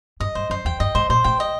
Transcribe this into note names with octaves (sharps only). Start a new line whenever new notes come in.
G2 D#5
G2 C5
F#2 C5
E2 G5
G2 D#5
G#2 C5
A#2 C5
A2 G5
D#5